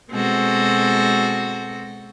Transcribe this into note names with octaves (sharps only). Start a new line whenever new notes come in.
B2 G#3 C4 F#4 A4